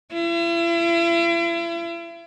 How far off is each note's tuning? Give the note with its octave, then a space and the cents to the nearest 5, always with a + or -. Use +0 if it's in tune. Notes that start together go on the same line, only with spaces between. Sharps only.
E4 +40